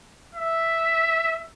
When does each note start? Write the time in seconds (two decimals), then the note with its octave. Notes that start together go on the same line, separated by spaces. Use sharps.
0.35 E5